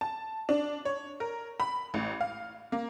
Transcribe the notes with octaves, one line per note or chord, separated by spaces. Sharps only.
A5
D4
C#5
A#4
B5
A1
F5
A#3